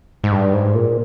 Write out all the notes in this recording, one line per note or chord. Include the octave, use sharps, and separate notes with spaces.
G#2
G2
G#2
A#2